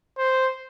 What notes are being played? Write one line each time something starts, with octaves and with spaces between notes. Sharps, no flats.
C5